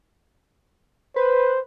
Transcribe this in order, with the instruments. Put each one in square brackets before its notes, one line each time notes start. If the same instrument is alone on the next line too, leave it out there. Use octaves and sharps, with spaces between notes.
[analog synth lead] B4 [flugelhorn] C5